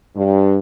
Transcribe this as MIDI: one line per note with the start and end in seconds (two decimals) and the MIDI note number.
0.16 0.57 43